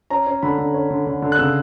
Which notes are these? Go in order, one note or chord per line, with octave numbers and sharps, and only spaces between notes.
C#4 A#5
C#4
D3 B5
D3
C#4
D3
D3
D3
F#6
C#3 E6